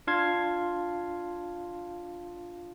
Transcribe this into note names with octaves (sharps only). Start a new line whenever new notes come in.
D4 F4 F5 A5 C6 G#6